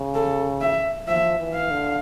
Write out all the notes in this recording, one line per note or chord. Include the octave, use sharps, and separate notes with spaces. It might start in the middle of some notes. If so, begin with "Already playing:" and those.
Already playing: C#3
A4
E5
F3 E5
E3
F5
D3